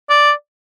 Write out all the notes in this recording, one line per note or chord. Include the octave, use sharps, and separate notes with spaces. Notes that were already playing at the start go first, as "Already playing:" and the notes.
D5